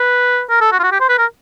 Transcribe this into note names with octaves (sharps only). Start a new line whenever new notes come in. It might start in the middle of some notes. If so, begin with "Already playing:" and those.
Already playing: B4
A#4
A4
F#4
F4
F#4
G4
C5
B4
A#4